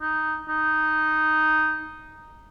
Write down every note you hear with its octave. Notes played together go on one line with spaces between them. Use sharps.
D#4
D#4